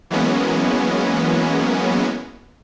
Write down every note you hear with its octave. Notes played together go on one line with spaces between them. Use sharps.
E3 F#3 G#3 A#3 B3 C#4